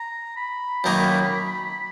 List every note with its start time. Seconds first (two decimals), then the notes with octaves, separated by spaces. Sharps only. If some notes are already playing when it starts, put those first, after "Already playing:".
Already playing: A#5
0.37 B5
0.84 F#2 D#3 A#3